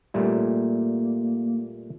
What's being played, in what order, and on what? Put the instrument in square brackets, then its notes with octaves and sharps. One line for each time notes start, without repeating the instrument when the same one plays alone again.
[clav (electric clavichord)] A#2 G3 A3 [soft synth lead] A#3